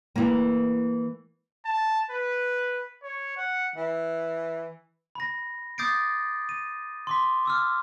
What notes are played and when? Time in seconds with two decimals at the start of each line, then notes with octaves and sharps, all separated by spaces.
0.16 E3 A#3
1.65 A5
2.11 B4
3.03 C#5
3.37 F#5
3.75 E3
5.15 B5 A#6
5.78 D6 D#6 G6 A6 C7 D7
6.49 D#7
7.07 C6 D6 B6
7.45 D6 E6 F6